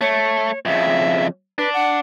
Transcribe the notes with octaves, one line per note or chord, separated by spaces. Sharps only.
A3 C#5
F2 C#3 E5
D4 B4
F#5